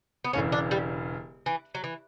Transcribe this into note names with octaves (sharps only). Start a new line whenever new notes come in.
B3
E1 E2 C#3 C#4
D4
G3
E3
F#3
E3